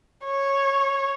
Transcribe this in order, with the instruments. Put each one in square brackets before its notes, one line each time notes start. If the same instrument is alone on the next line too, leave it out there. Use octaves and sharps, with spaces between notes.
[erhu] C#5